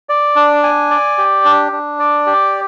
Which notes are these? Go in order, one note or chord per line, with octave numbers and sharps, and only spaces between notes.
D5
D4
G#5
D5
G4
D4
D4
D5
G4